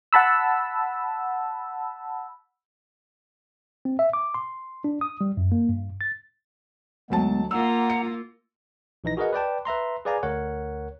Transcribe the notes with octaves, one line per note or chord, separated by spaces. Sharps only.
F#5 A5 B5 E6
C4
E5
D6
C6
D4
D#6
G3
F#2
A#3
G2
A6
D2 F#3 G#3 B3 A5
A#3 F4 F#5 A#5 E6
C#7
A#1 E3 D#4 A#6
F#4 G#4 A#4 B4 D#5 F#5
B4 D5 G5 A5
B4 E5 A#5 C6
G#4 B4 D5 F5 G#5 A#5
D2 A#4 C#5 F#5